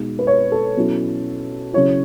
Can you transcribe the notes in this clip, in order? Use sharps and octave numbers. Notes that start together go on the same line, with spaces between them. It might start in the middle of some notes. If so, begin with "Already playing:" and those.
Already playing: B2 G#3 D#4
B4
C#5
A4
B2 F#3 C#4 E4
C#3 F#3 C#4 E4 C#5